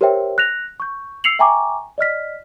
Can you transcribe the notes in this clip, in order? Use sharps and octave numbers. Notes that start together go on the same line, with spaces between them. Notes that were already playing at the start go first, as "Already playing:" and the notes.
G4 A#4 C5 C#5 E5 G5
F#6 A#6 F7
C#6 G6
E6 C7 C#7 F7 F#7
E5 G5 G#5 A#5 C#6 D6
D5 D#5 F6 B6